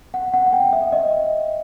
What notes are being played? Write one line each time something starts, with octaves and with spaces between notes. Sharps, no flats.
F#5
F#5
F#5
G5
E5
D#5